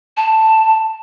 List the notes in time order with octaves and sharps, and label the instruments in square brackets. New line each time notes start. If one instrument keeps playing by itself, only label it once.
[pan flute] A5